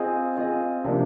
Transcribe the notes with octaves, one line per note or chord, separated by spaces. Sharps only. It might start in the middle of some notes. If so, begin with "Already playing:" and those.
Already playing: C4 F4 G#4 D#5
C4 F4 G#4 D#5
C3 F3 A#3 D4